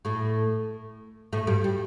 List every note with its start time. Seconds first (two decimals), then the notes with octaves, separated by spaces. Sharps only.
0.05 A2 A3
1.33 A2 A3
1.47 G2 G3
1.64 G3